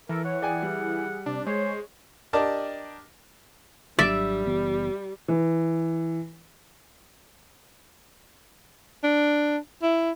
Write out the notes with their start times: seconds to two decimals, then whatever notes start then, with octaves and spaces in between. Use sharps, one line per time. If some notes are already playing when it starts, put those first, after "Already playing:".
0.09 E3 A4 A#4
0.25 C#5 F#5
0.42 G#4 D5 G5 G#5
0.63 G3
1.26 C3 D4
1.46 G#3 C5 C#5
2.33 D4 G4 A#4 D5 D#5 A5
3.99 G#1 F#3 G3 D4 D5 E5
4.46 F#1 E3 B3
5.28 E3
9.04 D4
9.83 E4